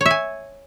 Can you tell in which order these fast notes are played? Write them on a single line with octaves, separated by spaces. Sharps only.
C#5 E5 G#5